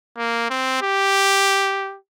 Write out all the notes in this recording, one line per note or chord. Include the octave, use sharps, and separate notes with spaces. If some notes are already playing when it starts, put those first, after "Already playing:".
A#3
C4
G4